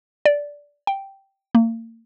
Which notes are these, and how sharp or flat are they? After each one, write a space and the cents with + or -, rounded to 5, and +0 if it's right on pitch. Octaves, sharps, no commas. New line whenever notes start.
D5 -10
G5 -5
A#3 -40